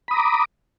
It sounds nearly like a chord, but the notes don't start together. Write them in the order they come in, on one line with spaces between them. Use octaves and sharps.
B5 D#6 A#5 D6